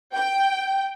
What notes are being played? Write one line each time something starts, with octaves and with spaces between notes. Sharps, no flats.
G5